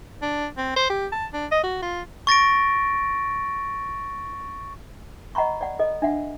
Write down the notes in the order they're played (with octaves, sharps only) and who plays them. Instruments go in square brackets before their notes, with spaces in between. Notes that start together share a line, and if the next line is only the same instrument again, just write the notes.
[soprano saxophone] D4
C4
C5
G4
A5
D4
D#5
F#4
F4
[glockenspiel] C#6 A6 A#6 D7
[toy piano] D#5 F#5 A#5 B5 C#6
D5 F#5
A4 D#5
D4 E5 F#5